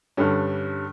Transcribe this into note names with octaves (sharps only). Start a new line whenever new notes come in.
G2 D3 G3 C#4